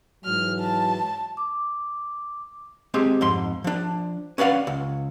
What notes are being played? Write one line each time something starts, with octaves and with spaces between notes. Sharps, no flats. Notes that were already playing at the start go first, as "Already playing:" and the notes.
G#2 E3 F#3 F6
A5
D6
G#3 C4 G4 G#4
F2 G#2 C6
F3 D4
C#4 B4 D5 F5 F#5
C#2